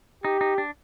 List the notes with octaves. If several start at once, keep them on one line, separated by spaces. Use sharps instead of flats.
D#4 G4
D#4
D4